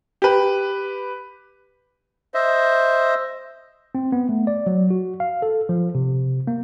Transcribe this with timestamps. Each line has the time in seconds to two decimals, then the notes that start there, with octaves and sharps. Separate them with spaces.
0.22 G4 B4
2.34 C5 D#5 E5
3.95 C4
4.12 B3
4.29 A3
4.47 D5
4.67 F#3
4.90 F#4
5.20 F5
5.42 A4
5.69 F3
5.95 C3
6.47 A#3